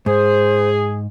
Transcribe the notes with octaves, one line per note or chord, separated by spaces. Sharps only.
G#2 G#4 C5